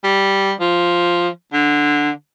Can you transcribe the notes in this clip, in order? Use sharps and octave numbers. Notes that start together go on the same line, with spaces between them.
G3
F3
D3